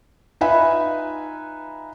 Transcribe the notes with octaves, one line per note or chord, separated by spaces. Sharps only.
D#4 F4 B4 E5 G#5 B5